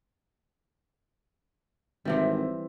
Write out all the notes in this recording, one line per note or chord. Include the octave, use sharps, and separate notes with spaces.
G#1 C3 E3 G3